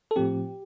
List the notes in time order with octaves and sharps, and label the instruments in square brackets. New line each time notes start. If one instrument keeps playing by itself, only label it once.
[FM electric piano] A4
A2 F3 C4 G4